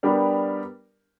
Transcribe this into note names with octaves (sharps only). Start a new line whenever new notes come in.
G3 B3 D4 G4 A#4